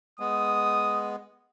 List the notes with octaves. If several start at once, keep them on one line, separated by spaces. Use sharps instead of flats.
G#3 B3 D#6